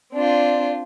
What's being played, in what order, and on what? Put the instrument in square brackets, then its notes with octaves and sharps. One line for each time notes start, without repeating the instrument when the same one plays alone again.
[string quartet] C4 D4 F4 [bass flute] D5